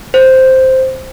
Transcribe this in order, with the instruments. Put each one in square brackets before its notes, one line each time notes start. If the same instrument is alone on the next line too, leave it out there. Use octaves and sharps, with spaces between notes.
[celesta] C5